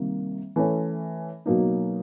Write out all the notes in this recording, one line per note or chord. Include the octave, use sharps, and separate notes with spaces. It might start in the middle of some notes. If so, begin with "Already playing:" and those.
Already playing: C3 D#3 G3 A#3
E3 A3 C#4
B2 F#3 A#3 D#4